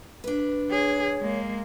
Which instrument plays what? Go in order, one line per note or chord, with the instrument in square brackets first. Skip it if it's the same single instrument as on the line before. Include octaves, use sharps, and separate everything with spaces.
[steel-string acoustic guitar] D4 B4
[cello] G#4 [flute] C#5
[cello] G#3 A#3